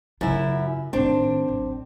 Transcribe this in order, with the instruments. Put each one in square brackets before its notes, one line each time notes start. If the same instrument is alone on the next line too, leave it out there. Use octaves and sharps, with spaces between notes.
[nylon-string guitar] F#2 E4 [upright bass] C#3 F4
[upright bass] A2 D#3 [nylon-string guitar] C4 D4
[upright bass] D1 A1